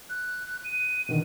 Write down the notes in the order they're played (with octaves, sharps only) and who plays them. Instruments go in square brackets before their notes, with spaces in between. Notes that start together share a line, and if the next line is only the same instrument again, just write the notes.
[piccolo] F#6
D#7
[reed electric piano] B2 D3 D#3